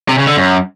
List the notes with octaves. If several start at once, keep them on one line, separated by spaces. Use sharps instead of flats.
C3
C#3
D3
F#2